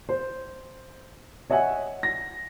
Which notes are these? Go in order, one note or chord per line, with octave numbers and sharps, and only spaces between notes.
C5
C#5 D#5 E5 F#5 G#5
A#6